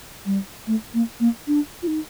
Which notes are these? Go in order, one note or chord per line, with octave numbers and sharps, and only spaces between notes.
G3
A3
A#3
A#3
D4
F4
D#4